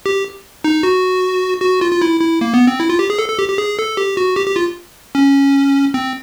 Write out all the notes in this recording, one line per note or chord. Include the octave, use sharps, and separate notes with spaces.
G4
D#4
F#4
F#4
F4
F4
E4
E4
A#3
B3
C4
E4
F4
G4
G#4
A4
A4
G4
G4
G#4
A4
G4
F#4
G4
G4
F4
C#4
C4